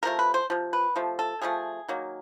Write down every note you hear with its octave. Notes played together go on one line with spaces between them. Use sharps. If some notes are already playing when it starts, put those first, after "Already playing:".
C3 F3 A3 A#4
B4
C5
C3 F3
B4
C3 F3 A3
A4
C3 F3 A3 G#4
D#3 F#3 A#3